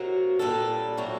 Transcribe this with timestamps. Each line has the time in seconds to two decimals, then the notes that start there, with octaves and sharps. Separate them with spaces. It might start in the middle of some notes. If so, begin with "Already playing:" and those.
Already playing: C3 F#3 A#3 F#4 A#4
0.39 A#2 G3 D4 A4
0.97 C3 F#3 A#3 F#4